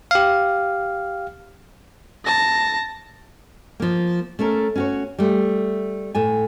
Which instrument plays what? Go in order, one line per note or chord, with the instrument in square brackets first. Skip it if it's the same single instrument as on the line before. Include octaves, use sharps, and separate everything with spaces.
[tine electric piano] G4 F5
[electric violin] A5 A#6
[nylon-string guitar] F3 A#3
A3 C#4 A4 A#4
C#4 F#4 C#5
G3 A3
A2 A4 G#5